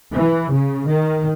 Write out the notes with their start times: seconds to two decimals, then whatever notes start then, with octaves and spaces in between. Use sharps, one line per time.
0.14 E3
0.50 C#3
0.86 D#3